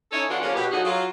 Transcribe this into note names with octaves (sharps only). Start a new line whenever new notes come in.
C#4 D#4 E4 A4 C#5
F2 E3 D4 F4 F#4
C#3 F3 A#3 C#4
B2 G4
D3 F3 F#3 D#4 F#4 G#4
F#3 F4